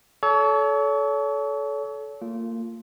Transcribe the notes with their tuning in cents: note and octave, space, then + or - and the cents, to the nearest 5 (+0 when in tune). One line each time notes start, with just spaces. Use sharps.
A4 -25 C#5 +35
A#3 -30 F4 -5